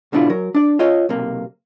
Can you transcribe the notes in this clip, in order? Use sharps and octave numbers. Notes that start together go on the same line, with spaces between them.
G#2 B2 D3 D4 E4 F4
F#3 A#4
D4 D5
F4 C#5 D#5
B1 C3 A#3